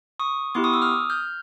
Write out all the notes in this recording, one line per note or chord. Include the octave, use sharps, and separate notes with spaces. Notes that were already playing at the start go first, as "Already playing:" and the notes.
C#6 D#6
B3 E4 G4 C6 D6
C#6 D#6
D6 E6
D#6 F6
F6 G6